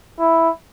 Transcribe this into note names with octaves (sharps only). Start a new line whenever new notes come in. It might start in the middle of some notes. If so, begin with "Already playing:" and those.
E4